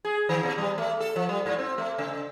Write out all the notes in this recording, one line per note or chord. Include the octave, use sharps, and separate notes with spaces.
G#4
D#3
B2
G3
A3
A4
F3
G3
G#2
C4
A3
C#3